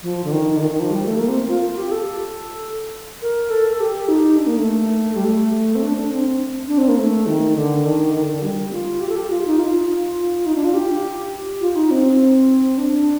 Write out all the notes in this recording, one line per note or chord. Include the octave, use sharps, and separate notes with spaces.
F3
D3
D#3
D3
D#3
D#3
F3
G3
A3
A#3
C4
F4
G4
A4
A#4
A4
A4
G4
D#4
D4
A#3
A3
G3
A3
C4
D4
D4
C4
D4
C4
A#3
A3
D#3
D3
D#3
D#3
D3
D3
G3
F4
G4
A4
G4
F4
D#4
F4
D#4
D4
F4
G4
F4
D#4
C4
D4